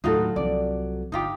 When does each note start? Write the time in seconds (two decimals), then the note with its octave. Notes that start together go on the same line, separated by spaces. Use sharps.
0.04 D#2 A2 F#3 D#4 F4 F#4 A4
0.36 C2 C3 F3 D5
1.12 G1 D#4 F4 G4